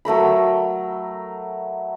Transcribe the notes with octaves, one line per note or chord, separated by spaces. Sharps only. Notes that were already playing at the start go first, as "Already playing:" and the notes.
F#3 A3 A#4 B5